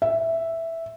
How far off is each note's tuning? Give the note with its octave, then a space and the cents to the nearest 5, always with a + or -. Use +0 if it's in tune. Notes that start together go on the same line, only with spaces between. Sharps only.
E5 +0